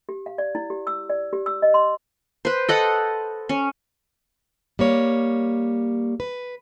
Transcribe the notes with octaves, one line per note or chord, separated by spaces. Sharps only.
G4
F5
D5
E4
G4
E6
D5
G4
E6
D#5
C6
B4 C5
A4 D#5 F#5
C#4
G3 A#3 C#5
B4